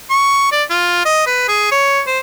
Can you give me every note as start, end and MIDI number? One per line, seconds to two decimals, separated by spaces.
0.10 0.50 85
0.52 0.63 74
0.70 1.04 65
1.05 1.23 75
1.26 1.45 71
1.48 1.70 68
1.71 2.01 73
2.07 2.19 72